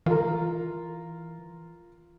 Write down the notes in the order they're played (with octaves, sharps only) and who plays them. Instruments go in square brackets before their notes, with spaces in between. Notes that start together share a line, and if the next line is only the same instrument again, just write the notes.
[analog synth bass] E3 [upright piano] F4 A#4